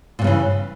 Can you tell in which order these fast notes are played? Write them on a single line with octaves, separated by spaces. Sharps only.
A#2 G2 C#3 E3